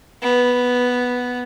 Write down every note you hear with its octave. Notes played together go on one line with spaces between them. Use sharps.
B3